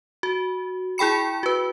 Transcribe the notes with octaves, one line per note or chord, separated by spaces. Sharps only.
F#4
E4 G#4 G5 B5 C#7
F#4 B4